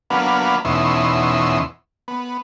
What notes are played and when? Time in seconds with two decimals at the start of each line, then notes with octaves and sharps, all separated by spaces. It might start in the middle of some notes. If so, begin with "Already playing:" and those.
0.10 F#3 A#3 B3 D4 B4 F5
0.65 E2 B2 C#4 D#4 E5 C6
2.08 B3